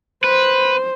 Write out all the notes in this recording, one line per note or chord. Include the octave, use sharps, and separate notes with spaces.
B4 C5